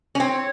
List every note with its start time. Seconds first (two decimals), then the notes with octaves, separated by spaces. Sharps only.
0.15 C#4
0.20 C4 C#5